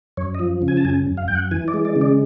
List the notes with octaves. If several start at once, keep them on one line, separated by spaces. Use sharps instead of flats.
F#2 C#5
D#5
F3
C#3
G#5
A5
F#2 G#5
F#2
F5
F#2 G5
F#5
E3 G#5
D5
G#3
D5
C#3
D5